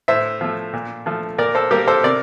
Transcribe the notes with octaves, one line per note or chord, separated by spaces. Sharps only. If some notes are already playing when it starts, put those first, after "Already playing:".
A2 C5 E5
F3 A3
A#2
F3 A3
A#2 A#4 D5
A4 C5
G3 A#3 G4 A#4
A4 C5
C3 A#4 D5